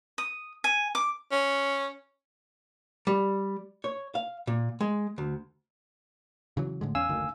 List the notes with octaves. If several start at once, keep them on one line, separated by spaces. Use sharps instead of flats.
D#6
G#5
D6
C#4
G3
C#5
F5
A#2
G#3
D2
C#3 E3 F#3
A2 D3 G#3
E2 C#4 F5 G#5 E6
F#1 D2 D#3